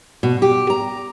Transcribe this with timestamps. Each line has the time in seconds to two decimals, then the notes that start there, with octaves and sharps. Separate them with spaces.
0.23 B2
0.42 G4
0.70 A#5